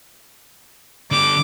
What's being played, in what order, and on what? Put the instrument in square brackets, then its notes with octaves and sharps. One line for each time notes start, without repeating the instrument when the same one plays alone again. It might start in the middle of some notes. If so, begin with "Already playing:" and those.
[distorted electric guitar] D3 G4 [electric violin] D6